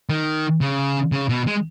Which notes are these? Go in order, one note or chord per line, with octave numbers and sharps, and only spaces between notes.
D#3
C#3
C#3
B2
G#3